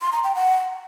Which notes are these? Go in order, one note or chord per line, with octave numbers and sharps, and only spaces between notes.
C6
A#5
G5
F#5